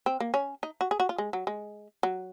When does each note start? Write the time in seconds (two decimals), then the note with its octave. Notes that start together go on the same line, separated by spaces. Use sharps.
0.06 C4
0.20 A#3
0.34 C#4
0.63 D#4
0.81 F#4
0.91 G#4
1.00 F#4
1.09 F4
1.18 G#3
1.33 F#3
1.47 G#3
2.03 F#3